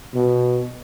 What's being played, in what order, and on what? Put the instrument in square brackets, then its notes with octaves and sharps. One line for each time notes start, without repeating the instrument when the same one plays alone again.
[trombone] B2